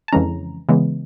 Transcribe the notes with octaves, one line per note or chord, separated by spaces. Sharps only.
A5
F2 C#3 E3 G#3 C#4 A#5
C#3 E3 G#3 B3